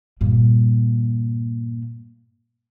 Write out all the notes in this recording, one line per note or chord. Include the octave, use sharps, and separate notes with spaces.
G2 A#2